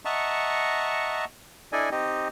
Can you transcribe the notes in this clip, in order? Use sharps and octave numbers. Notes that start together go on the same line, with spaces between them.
D#5 E5 F#5 A5 A#5 C#6
D4 E4 A4 D5 D#5 G#5
C4 D#4 G4 D#5